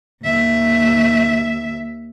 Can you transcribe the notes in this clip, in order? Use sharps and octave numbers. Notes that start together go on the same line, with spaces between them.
D#2 E5